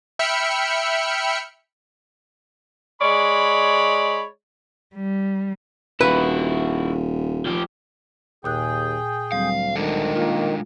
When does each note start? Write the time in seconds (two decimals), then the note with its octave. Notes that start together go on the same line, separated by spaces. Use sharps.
0.19 E5 G5 B5 F6 C#7
3.01 G#3 C#5 D5 B5
4.95 G3
6.01 D#1 E4 F#4 B4
7.46 F3 G4
8.44 D#2 A#2 G#4 G5 D#6 F#6
9.32 D2 F#3 G3 C4 F5
9.76 D#3 G#3 D4 A4
10.15 A#3 F4